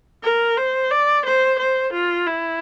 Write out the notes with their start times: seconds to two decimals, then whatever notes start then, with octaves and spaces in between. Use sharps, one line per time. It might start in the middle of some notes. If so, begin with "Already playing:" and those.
0.24 A#4
0.58 C5
0.91 D5
1.26 C5
1.60 C5
1.93 F4
2.27 E4